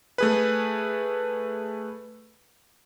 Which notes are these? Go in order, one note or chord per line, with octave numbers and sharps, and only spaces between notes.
A3 G#4 B4